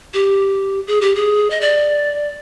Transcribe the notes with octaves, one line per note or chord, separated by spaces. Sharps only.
G4
G#4
G4
G#4
D#5
D5